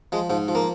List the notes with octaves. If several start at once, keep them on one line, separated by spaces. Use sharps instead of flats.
F3 G#3
G#2 F3
F3
A#3